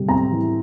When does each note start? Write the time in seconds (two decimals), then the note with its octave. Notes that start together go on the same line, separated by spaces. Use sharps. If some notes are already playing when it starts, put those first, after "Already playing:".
Already playing: C3 G3
0.08 C4 A#5
0.31 E3